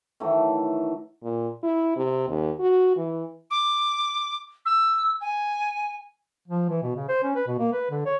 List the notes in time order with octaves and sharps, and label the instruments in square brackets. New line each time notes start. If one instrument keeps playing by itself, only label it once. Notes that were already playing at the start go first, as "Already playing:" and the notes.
[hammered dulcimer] D#3 E3 F#3 A3
[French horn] A#2
E4
C3
D#2
F#4
E3
[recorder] D6
E6
G#5
[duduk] F3
E3
B2
C#3
C5
C#4
B4
B2
A#3
B4
D3
C#5